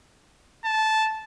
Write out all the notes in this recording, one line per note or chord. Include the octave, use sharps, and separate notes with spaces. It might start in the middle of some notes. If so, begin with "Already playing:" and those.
A5